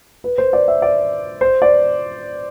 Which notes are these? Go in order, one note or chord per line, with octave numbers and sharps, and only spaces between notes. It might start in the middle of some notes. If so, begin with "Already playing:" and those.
B4
C5
D5
E5
D5
C5
D5